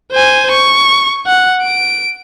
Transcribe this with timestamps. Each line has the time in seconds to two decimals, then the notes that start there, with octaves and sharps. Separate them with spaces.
0.12 C5 G#5
0.51 C#6
1.27 F#5
1.63 D7